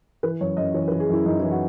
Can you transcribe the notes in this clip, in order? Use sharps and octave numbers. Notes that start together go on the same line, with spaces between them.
E3 B4
F#2 C#5
F#2 D#5
E3 C#5
B4
E3
G#4
F#2 E4
F#2 D#4
E3 E4
F#4